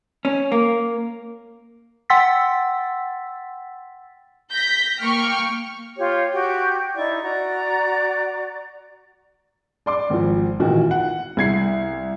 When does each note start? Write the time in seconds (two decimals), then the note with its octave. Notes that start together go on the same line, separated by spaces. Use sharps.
0.25 C#4
0.52 A#3
2.10 F#5 G5 C6 E6 A6 B6
4.51 G6 A#6 B6
5.01 A#3 G5 C#6 F6
5.98 F4 G4 C#5
6.33 F#4 G4 G5
6.95 D#4 E4 D5 C#6
7.23 F#4 D5 A#5
9.86 D5 C6 D6
10.10 G#1 F3
10.60 A1 A#2 D#3 F#4 G5
10.91 F#5
11.37 C2 G#6 C7